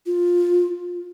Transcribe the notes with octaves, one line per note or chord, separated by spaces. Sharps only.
F4